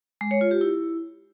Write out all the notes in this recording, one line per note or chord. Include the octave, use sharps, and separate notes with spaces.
G#3
C#5
F4
G4
E4